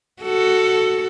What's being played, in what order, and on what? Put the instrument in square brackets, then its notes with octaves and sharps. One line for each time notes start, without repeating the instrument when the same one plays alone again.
[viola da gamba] F#4 A4